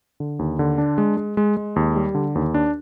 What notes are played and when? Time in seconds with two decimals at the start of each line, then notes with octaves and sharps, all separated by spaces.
0.20 D3
0.39 D#2
0.59 D3
0.78 D4
0.98 G#3
1.17 G#3
1.37 G#3
1.57 G#3
1.76 D#2
1.96 G3
2.15 D3
2.35 D#2
2.54 D4